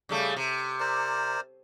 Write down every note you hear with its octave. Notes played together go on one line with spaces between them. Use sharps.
C#3 G3 A3
C3
A#4 C5 D5